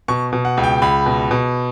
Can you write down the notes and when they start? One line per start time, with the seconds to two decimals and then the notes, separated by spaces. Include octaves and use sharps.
0.08 B2 C#6
0.33 B2
0.45 F#5
0.57 C#2
0.64 G5
0.82 C#2 B5
1.06 B2
1.31 B2